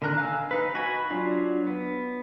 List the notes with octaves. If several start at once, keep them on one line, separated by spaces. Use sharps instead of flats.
D3 D#3 A#4 A#5 F#6
F5 G#5 E6
D#4 B4
F#4 G#5 B5
F#3 D4 F4
B3